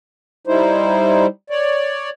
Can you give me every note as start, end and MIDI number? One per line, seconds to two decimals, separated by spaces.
0.47 1.26 55
0.47 1.26 63
0.47 1.26 64
0.47 1.26 72
1.50 2.10 73
1.50 2.10 74